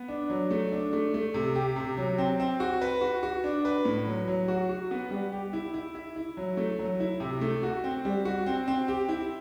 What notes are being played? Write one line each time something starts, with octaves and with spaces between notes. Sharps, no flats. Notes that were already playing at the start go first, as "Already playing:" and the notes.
Already playing: B3
D4
F#3
A3
D4
A3
A3
C3
G4
C3
F#3
C4
C4
F#4
B4
F#4
F#4
D4
B4
A2
F#3
F#3
F#4
F#4
B3
G3
G4
E4
E4
E4
E4
F#3
A3
F#3
E4
C3
A3
F#4
C4
G3
F#4
C4
C4
G4
E4